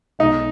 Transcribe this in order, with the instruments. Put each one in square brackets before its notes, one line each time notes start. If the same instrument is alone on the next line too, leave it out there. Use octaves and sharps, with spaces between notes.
[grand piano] B1 B2 G#3 [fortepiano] D#4